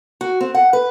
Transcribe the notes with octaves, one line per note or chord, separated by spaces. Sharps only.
F#4
C4
F#5
B4